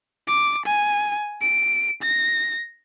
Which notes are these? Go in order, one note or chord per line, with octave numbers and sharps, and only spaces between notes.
D6
G#5
D7
A#6